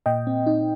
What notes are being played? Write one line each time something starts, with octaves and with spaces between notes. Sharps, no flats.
A#2 D#5 G5
C4
D#4